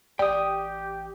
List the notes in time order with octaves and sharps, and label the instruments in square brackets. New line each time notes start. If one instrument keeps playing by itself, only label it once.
[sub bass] A1 [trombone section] G4 [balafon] D5 [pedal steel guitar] G5 D#6